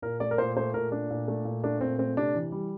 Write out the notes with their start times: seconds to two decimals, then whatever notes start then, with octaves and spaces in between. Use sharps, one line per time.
0.02 A#2 A#4
0.20 A3 D5
0.31 A#4
0.38 A#2 C5
0.56 A3 C5
0.74 A#2 A#4
0.92 A3 D4
1.10 A#2
1.28 A3
1.45 A#2
1.64 A3 D4
1.81 A#2 C4
1.99 A3 C4
2.17 C3 D4
2.35 E3
2.52 G3